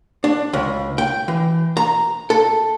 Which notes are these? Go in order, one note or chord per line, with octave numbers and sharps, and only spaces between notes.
D4
C#2
G5
E3
A#5
A4